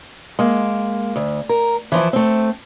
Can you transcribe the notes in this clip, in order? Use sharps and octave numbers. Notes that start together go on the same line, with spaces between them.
G#3 A#3
D2
A#4
E3 F3 E4
A3 C4